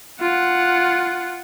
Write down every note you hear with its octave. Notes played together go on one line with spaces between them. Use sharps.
F4 F#5